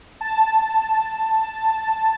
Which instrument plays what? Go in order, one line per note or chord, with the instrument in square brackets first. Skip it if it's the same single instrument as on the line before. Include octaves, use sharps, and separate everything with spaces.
[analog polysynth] A5